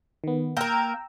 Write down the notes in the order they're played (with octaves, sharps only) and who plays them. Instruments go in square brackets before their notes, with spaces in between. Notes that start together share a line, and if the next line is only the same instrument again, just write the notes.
[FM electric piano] D#3 B3
[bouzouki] A#3 A#4 [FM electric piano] G5 A#5 E6